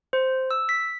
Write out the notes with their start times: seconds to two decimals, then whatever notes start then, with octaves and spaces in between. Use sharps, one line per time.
0.13 C5
0.51 E6
0.69 B6